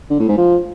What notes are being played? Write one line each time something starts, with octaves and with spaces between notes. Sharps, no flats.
D3
A2
G#2
F3